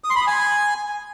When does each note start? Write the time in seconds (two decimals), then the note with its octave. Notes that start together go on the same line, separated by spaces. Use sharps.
0.04 D#6
0.10 C6
0.16 B5
0.21 D#6
0.27 G#5